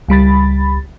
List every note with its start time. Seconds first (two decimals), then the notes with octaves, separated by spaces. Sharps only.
0.09 C#2 G3 B5 A6